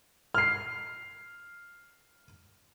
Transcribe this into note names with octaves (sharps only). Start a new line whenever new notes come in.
F6 C7